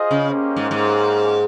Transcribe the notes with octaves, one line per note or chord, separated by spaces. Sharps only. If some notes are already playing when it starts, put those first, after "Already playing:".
Already playing: F4 G#4 C5 D#5
C#3
A#3 C#4 G4 C5 D#5
G#2
G#2